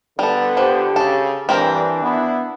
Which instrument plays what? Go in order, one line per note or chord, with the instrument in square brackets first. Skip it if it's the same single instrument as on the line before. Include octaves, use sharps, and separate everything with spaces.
[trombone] D3 [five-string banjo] G3 A4 [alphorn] B3
[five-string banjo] F3 [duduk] G4
[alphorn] C#3 [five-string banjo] A4
[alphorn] G2 [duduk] E3 [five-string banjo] C4 G4 A#4 [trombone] D4
[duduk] B3 [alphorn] E4